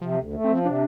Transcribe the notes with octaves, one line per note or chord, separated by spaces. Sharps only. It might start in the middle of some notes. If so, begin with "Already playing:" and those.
C3 F3
D2
A3
F3 C4
C3 D4